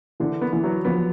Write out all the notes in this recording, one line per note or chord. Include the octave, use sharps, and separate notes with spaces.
D3 E3
B3
E3
F#3
F3 B3